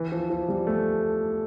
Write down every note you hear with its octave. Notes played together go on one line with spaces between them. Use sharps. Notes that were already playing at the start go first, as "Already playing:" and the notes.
Already playing: E3
F3
F3
G3
A3